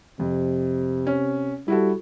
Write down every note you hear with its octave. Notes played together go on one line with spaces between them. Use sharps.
F2 C3
C#4
G3 E4 F#4 A4